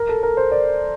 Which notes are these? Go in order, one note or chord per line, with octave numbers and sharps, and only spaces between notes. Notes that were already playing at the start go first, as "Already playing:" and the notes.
Already playing: A#4
A4
A#4
C5
D5